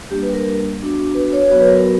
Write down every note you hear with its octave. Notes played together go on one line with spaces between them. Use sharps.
G3 A#3 D4 G4
B4
A#4
B3 D4 F#4
B4
C#5
F#3 B3 F#4 C#5
B4
A#4